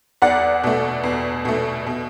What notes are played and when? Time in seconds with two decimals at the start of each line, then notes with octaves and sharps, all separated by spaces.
0.22 E2 D5 F#5
0.64 B2 A3
1.04 E2
1.45 B2 A3
1.87 B2